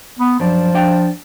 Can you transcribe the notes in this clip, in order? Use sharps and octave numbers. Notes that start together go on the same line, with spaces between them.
B3
F#2 F3 D4
D4 F5 G5